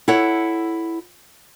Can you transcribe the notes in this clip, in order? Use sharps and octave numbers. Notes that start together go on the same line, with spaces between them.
E4 A4 C#5 F#5